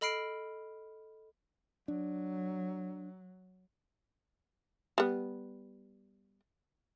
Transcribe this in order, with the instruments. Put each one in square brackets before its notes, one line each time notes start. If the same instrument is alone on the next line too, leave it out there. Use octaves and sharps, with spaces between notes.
[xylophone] A4 D#5 B5 F6 C7 D7
[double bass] F#3 [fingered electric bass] D4
[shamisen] G3 B3